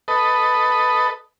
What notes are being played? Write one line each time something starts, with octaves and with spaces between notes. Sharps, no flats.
A4 B4 D#5